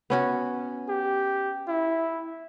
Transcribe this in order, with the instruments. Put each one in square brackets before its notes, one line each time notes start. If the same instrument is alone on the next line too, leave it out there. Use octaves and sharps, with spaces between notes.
[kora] B3 C#4 F#4
[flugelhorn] G4
E4